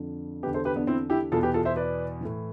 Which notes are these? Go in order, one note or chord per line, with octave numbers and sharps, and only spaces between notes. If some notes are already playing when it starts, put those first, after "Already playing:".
Already playing: F2 D3
E2 D3 G4 B4
A4 C5
G4 B4
B3 D4
C4 E4
E4 G4
E2 B2 F4 A4
G4 B4
F4 A4
C5 E5
B4 D5
A2 E3